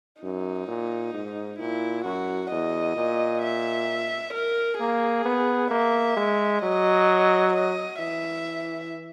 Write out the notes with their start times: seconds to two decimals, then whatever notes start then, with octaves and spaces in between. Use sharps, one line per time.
0.22 F#2 D#4
0.68 A#2
1.13 G#2
1.59 A#2 E4
2.05 F#2 F#4
2.51 E2 D#5
2.96 A#2
3.42 E5
4.34 A#4
4.79 A#3 G#4
5.25 B3
5.70 A#3 E5
6.17 G#3
6.62 F#3 D#5
7.54 D#5
7.99 E3 E5